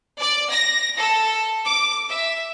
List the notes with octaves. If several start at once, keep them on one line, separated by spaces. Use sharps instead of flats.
D5
A#6
A4
D6
E5